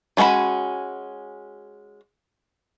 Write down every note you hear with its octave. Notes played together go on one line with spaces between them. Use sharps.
F#3 G#3 C#4 F#4 B5